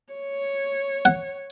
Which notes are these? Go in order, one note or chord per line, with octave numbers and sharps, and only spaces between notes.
C#5
F#5